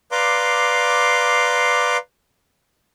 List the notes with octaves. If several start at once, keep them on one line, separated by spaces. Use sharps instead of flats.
B4 D5 F5 A#5 C6 D6